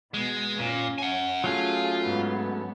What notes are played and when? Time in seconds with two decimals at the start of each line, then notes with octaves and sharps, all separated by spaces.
0.14 B2 G#3
0.59 A#2 C#4
0.98 F#5 G#5
1.44 F#3 A3 C#4 F4 G#4
2.04 G#2 B3